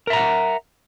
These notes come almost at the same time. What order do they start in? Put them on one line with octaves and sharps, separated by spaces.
A#4 E5 A#5 F#5